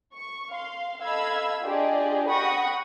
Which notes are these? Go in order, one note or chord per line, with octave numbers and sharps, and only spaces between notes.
C#6
F5 C6
A4 D#5 F5 B5 E6 G#6
D4 F4 G4 G#4 D5 D#5
F#5 G5 B5 C#6 D#6 A#6